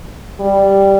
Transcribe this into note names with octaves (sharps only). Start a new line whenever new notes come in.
G3